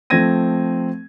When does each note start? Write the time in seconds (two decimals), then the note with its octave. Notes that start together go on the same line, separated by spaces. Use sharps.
0.10 F3 A3 C4 G#6 A#6 D#7